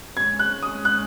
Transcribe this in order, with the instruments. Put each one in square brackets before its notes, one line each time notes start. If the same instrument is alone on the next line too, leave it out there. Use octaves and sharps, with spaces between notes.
[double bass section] G#2 G#3 C#4 [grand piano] G#6
[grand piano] F#6
D#6
F#6